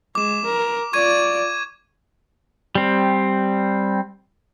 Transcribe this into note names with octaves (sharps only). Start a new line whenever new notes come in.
G#3 D6 E7
A#4
F4 D5 C#6 G#6 D#7
G3 C4